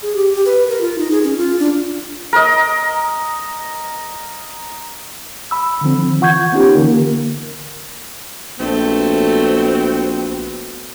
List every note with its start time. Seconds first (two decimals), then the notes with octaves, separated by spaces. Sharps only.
0.02 G#4
0.15 G4
0.34 G4
0.46 B4
0.69 A#4
0.81 F4
0.98 D#4
1.11 G#4
1.24 C#4
1.38 F4
1.59 D4
2.33 A#4 D#5
5.51 B5 E6
5.81 D3 D#3 F3 C4
6.21 E3 F4 F#5 C#6 G6 G#6
6.52 B3 C#4 D#4 F4 G4
6.75 D3 E3 A#3 A#4
8.60 A#1 A3 B3 C4 F#4